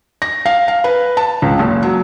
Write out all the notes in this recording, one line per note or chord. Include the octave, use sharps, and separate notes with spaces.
A#6
F5
F5
B4
A5
C#2
F#1
F#3